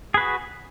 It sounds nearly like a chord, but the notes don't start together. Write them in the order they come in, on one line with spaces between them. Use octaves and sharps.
G#4 B4 F#4